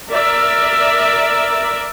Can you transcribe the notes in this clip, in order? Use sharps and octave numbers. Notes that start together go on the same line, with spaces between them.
A#4 D5 E5